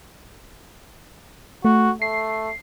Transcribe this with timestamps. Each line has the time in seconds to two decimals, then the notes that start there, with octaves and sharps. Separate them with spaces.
1.65 A3 F#4
2.02 A3 C7